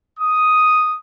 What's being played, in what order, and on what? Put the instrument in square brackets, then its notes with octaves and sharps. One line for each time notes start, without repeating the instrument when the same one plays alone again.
[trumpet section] D#6